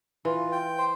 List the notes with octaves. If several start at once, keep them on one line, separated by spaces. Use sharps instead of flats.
E3 F4
G5
C5